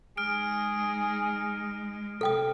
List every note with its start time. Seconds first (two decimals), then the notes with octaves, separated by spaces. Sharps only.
0.17 G#3 D#4 G#4 F6 D7
2.21 C3 A4 G5 D#6